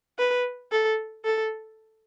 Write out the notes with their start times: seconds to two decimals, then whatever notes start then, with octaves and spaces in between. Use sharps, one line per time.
0.19 B4
0.72 A4
1.25 A4